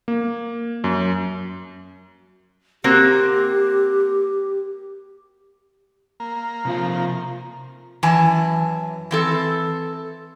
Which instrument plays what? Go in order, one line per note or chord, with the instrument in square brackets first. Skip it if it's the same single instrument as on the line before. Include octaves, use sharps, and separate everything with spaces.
[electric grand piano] A#3
F#2
[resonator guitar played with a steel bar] A#3 C4 F#4 [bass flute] G4
[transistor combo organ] A#3
[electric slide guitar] C3 F5 [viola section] F3
[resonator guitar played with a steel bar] F#2 E3 G#5 A5
E3 C4 A4